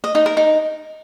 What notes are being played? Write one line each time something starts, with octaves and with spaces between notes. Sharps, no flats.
D#5
D#4
A#4
D#4